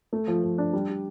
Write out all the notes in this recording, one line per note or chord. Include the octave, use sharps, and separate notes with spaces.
A3
F3
F3
D4
G3
G4